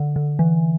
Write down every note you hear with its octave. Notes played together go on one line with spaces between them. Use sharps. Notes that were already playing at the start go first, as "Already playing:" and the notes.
Already playing: D3
D3
E3